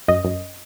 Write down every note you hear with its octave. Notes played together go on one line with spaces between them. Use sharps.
F#2 D#5
F#2